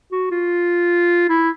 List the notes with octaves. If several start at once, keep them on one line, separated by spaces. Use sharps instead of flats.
F#4
F4
E4